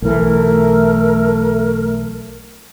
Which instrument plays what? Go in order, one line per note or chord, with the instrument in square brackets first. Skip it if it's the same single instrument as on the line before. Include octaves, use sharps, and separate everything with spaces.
[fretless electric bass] B1 E3 [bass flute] A3 [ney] A#4